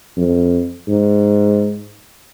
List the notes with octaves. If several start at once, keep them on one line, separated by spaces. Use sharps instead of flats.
F2
G#2